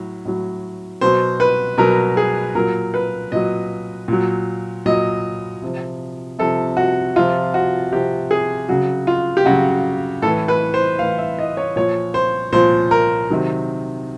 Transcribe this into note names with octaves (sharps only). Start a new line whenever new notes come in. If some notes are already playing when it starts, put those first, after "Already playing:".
Already playing: A2 F#3
A2 F#3
B2 F#3 C5
B4
B2 F#3 A#4
G#4
A#2 F#3 A#4
B4
A#2 F#3 D#5
A#2 F#3
A#2 F#3 D#5
C3 F3
C3 F3 A4
F#4
C3 F3 F4
F#4
C3 F3 G4
G#4
C#3 F#3 F#4
F4
G4
C#3 F#3 F#4
A2 E3 A4
B4
C5
A2 E3 F5
E5
D#5
C#5
A#2 F3 C#5
C5
A#2 F3 C5
A#4
C3 D#3 F#3